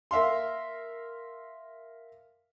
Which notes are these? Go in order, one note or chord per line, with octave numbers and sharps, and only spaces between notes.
A#4 E5 F5 C6